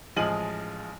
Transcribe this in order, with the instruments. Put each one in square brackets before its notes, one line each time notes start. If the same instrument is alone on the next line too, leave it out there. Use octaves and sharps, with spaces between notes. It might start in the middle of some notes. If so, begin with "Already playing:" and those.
[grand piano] A1 F3 G#3 G#4 D#7 F#7